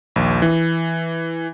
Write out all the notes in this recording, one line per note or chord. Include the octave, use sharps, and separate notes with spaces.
A#1 D#2
E3